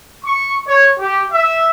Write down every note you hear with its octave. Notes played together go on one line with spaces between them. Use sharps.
C#6
C#5
G4
E5